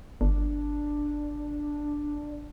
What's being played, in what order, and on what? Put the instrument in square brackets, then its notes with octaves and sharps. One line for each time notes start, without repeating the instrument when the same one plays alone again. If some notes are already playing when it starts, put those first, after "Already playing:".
[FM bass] G1 [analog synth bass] D4